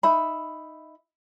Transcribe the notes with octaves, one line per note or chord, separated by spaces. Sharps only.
D#4 E5 B5